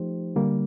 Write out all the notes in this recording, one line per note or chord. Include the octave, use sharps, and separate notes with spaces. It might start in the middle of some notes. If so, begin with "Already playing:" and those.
Already playing: F3 A3 D#4 G4 C5
D3 G3 A#3